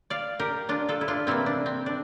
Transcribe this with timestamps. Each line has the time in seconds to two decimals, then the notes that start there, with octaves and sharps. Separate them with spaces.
0.10 D5 F5
0.39 G4 A#4
0.69 D4 F4
0.89 F4 A4
1.01 E4
1.08 D4 F4
1.27 C3 E3 A#3 C4 E4
1.46 D4
1.66 C4
1.86 D4